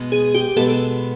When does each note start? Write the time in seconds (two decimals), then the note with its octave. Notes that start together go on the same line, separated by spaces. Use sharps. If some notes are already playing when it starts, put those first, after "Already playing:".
Already playing: B2 G#3 B3
0.12 G#4
0.34 G4
0.56 B2 G#3 B3 A4